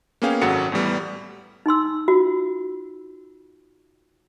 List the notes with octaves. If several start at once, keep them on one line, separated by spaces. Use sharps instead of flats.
A#3 B3 C#4 G#4 F5 G5
G#1 F#2 F#3 A4 F#5 C#7
E2 A2 G3 B3
D#4 G#5 C6 E6
F4 F#4